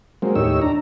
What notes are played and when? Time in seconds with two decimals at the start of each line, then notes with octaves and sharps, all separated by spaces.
0.22 F#3 G#3 A#3 C4
0.35 D#2 A2 D#4 G4 C#5 E6
0.62 D4 A#5